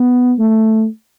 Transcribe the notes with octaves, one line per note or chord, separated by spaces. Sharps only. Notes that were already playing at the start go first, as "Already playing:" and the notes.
Already playing: B3
A3